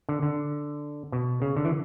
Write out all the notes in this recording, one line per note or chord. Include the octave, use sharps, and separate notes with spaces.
D3
D3
B2
C#3
D3
E3